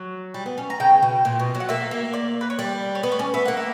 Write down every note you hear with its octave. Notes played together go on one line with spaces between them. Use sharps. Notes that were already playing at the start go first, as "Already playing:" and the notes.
Already playing: F#3
G3
B3
C#4
A#5
C#3 G5
B2
A#2
B2
F#3
F#5
A#3 E5
A#3
D5
B4
C#5
G3 D5
C#5
B3 B4
C#5
C#4 D5
B3 E5
A#3 F#5
E5